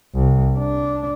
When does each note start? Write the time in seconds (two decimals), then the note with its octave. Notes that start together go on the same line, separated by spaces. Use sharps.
0.14 C2
0.58 D4